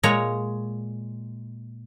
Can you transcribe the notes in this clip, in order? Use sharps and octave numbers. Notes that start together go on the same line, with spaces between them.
A#2 G#3 C#5 A#5